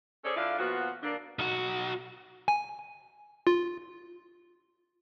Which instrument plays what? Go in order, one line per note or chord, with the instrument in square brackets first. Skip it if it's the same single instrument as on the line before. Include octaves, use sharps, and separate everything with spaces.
[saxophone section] C#4 G#4 A4 C5 D5
D3 D4 E4 F4 F5
A#2 F3 B3 F#4
D3 A#3 D4
[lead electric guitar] B1 F#4
[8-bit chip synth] G#5
F4